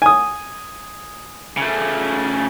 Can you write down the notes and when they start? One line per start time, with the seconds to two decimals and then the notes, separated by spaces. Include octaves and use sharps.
0.02 G#5 D#6
1.57 C#3 A3